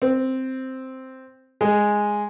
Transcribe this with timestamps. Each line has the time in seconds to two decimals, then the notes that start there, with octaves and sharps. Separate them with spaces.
0.02 C4
1.61 G#3